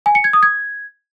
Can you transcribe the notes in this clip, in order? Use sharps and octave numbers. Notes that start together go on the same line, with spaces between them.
G#5
C#7
G#6
D#6
G#6